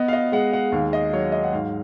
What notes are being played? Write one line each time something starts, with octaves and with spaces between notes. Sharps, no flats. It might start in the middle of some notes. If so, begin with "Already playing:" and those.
Already playing: B3 D#5
F5
D#5
G#3 F#5
F#5
D#2 F5
D#5
F#3 C#5
D#5
F#5
G#2 F5